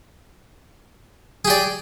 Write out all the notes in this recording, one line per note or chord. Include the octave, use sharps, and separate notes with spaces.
G4 G#4 D5